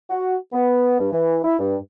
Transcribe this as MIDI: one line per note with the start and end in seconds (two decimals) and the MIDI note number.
0.10 0.36 66
0.52 0.98 59
0.99 1.10 43
1.12 1.38 52
1.43 1.55 64
1.59 1.76 43